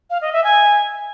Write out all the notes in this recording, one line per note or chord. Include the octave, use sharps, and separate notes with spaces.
F5
D#5
E5
G#5